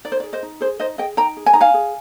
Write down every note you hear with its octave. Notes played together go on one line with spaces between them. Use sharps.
D#4 D5
C5
D5
G#4
C5 D#5
D#4
G#4 C5
D#4 C5 D#5
G#4 D#5 G5
D#4 G5 A#5
G#4
G#5
D#4 A#5
F5 G#5
G#4